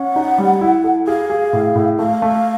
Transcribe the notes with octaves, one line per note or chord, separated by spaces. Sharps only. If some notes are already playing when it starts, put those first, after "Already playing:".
Already playing: C#4 F#5
D#4
G3
E4
A4
G#4 F5
G#4
A2
A2
A3 F5
A3